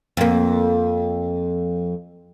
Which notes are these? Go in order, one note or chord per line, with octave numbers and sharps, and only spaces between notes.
F2 A#3